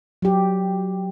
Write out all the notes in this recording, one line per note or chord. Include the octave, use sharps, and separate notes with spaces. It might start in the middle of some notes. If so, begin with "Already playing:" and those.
F#3 G4